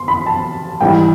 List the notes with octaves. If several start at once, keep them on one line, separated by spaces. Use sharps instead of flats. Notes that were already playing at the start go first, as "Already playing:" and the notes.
Already playing: C6
B5
A5
G#2 E3 G3 G5